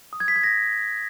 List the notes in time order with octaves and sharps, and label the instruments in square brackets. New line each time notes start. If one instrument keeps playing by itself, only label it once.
[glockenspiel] D#6
G#6
B6
G#6
A#6